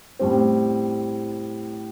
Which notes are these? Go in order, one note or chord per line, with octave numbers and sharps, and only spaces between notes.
A2 G3 C4